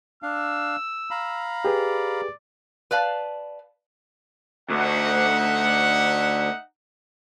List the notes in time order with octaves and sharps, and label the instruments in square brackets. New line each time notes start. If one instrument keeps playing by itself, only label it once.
[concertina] D4 F5 [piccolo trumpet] E6
[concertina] F5 A#5 B5
[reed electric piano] G4 G#4 B4 [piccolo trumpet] D5
[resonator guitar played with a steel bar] B4 D5 F5 A5
[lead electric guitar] D2 [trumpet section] D#4 E5 F#5